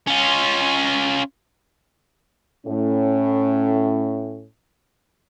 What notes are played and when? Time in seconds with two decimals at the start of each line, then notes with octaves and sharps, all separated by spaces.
0.07 C#4 F4
2.66 A2 C#4